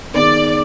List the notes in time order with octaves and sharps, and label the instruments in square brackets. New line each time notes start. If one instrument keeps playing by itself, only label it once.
[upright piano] D#3 B3 D#4 G#4 [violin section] D5